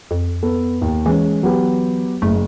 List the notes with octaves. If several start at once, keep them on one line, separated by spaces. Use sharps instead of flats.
F2
B3 A4
D#2
E3 G#3 C#4
F#3 B3 G4
F#1 A3